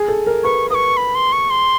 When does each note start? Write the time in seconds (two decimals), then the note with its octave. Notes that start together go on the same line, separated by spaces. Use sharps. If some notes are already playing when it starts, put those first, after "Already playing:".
Already playing: G#4
0.08 A4
0.27 A#4
0.44 B4 C#6
0.70 B4 C#6 D#6
0.97 B5
1.15 C6
1.32 C#6
1.50 C6